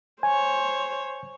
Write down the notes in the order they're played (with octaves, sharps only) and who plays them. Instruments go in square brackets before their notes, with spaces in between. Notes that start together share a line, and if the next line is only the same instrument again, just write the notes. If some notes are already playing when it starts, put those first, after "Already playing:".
[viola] C5 C#5 [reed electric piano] G#5